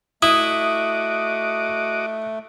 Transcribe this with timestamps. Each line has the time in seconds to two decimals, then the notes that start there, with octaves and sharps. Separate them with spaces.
0.22 A3 E4 F#4 D#5 D6 D#6